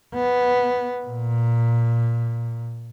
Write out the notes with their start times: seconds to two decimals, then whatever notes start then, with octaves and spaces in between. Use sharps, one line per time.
0.14 B3
1.05 A#2